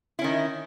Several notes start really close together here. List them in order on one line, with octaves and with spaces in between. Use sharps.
E4 C#4 D#3